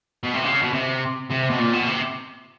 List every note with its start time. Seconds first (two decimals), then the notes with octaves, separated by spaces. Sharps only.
0.24 B2
0.34 C3
0.44 C#3
0.62 B2
0.73 C3
1.31 C3
1.50 B2
1.59 A#2
1.74 B2
1.88 C3